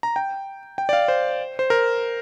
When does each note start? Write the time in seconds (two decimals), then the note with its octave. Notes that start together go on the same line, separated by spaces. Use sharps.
0.03 A#5
0.16 G5
0.78 G5
0.89 D5
0.93 F5
1.08 C5
1.59 C5
1.70 A#4